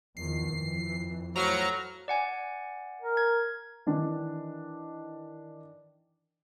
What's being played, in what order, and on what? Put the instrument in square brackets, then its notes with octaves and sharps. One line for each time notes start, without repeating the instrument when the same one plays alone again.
[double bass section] E2 D#3 F3 [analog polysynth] C7
[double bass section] F2 E3
[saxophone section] A2 F3 F#3 [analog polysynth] A#5 F6 C#7
[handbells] D5 F#5 G#5
[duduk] A#4
[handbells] G#6
[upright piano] D#3 E3 D4